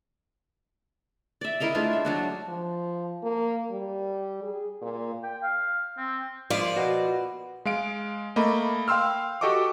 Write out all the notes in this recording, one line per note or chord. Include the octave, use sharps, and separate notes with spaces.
D5 E5
E4 A#4 D#5 F5
G#3 A3 D4 F4
E5
F#3 D4 F#4
F3
A#3
G3
G#4
A#2
G5
F5
C4
F3 A#3 F4 D5
B3 F#4 D#5
G#3 F5 D7
A3 A#3 D#5 B5
F5 G5 C6 E6 F6
F#4 G4 A4 D#5 C#6 D6